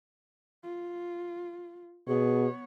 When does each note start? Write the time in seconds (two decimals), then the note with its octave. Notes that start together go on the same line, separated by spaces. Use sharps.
0.63 F4
2.08 B2 B3 G#4 C#5